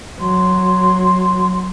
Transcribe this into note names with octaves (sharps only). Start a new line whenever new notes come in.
F#3 C6